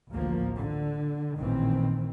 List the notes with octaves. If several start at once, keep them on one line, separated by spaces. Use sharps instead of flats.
A1 D2 F3 A#3
D3
A1 A#2 D#3 E3 C4